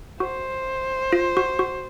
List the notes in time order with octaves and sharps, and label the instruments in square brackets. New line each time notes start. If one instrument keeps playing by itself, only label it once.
[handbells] F#4 [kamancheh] C5
[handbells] F4
F#4
F#4